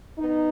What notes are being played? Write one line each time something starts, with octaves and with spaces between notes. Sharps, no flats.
B3 D#4